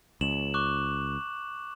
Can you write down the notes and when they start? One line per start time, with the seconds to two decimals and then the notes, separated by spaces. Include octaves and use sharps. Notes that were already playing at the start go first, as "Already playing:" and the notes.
0.21 C#2 E7 F#7
0.54 C#6 D6 F#6